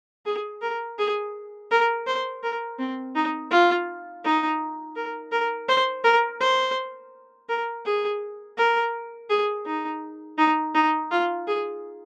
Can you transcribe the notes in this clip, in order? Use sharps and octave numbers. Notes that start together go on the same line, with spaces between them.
G#4
A#4
G#4
A#4
C5
A#4
C4
D#4
F4
D#4
A#4
A#4
C5
A#4
C5
A#4
G#4
A#4
G#4
D#4
D#4
D#4
F4
G#4